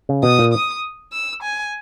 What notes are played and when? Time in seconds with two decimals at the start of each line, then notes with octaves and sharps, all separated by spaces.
0.09 C#3
0.23 B2 D#6
0.39 A#2
0.53 D#6
1.13 E6
1.43 G#5